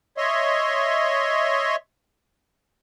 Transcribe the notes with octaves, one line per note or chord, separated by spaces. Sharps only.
C#5 D#5 E5 C6